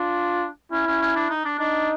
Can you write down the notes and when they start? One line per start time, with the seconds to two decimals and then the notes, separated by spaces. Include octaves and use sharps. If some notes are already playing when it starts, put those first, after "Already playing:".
Already playing: D4 F4
0.72 C#4 E4
0.87 C#4
1.01 C#4
1.16 D4
1.30 D#4
1.45 D4
1.59 D4 D#4